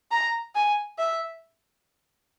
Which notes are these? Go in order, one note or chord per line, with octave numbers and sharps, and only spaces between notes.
A#5
G#5
E5